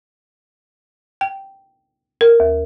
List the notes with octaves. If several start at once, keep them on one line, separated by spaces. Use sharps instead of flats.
G5
A#4
D#2